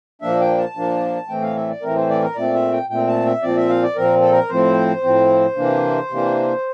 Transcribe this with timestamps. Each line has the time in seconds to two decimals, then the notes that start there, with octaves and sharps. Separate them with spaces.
0.22 A#2 F3 A#3 D4 E5
0.40 G5
0.58 A5
0.76 A#2 F3 A#3 D4
1.29 A2 E3 A3 C4 G5
1.42 F5
1.56 E5
1.70 D5
1.82 A2 E3 A3 C4 A#4
1.96 C5
2.09 D5
2.23 A#4
2.36 A#2 A3 C4 D5
2.54 E5
2.72 G5
2.90 A#2 A3 C4 G5
3.08 A5
3.25 E5
3.42 A#2 F3 C4 D5
3.57 E5
3.69 F5
3.83 D5
3.96 A#2 F3 C4 A#4
4.21 A4
4.32 A#4
4.49 A2 F3 C4 C5
5.03 A2 F3 C4
5.56 C3 E3 A#3 D4
6.10 C3 E3 A#3 D4